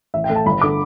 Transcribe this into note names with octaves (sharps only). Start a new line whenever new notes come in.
A1 E5
G5
A2 A3
A5
G1 B5
D3 A3 D6